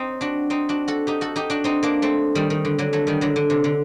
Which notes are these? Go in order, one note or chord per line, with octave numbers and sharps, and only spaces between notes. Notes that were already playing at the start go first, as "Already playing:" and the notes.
Already playing: C4 D#4
D4 F#4
C4 D#4
D4 F#4
F#4 A4
D#4 G4
F#4 A4
D#4 G4
D4 F#4
C4 D#4
A#3 D4
A3 C4
D#3 G3
D#3
D3
D3 F#3
F#3 A3
D#3 G3
D3 F#3
D3
C3
D3